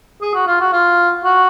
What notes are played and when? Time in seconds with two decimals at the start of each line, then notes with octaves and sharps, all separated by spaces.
0.22 G#4
0.34 F#4
0.47 F4
0.61 F#4
0.73 F4
1.25 F#4